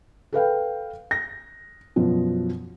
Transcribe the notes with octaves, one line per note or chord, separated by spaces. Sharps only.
A4 B4 F5 G5
A#6
F#2 B2 F3